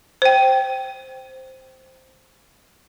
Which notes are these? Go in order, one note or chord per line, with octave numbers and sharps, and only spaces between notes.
C5 G5